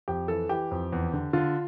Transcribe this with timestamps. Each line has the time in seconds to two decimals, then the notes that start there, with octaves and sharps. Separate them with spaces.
0.08 F2 G4
0.28 E3 A4
0.49 E3 G4
0.71 F2
0.92 E2
1.13 D3
1.33 D3 F4